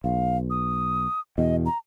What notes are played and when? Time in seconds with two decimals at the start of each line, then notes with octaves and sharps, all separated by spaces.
0.04 B1 F5
0.50 D#6
1.38 E2 B2 D#5
1.66 A#5